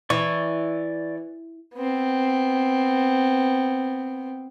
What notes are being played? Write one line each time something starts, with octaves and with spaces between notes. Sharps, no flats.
E3 D5 C#6
B3 C4